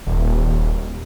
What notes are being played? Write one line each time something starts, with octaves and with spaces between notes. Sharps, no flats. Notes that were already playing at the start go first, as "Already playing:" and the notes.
D#1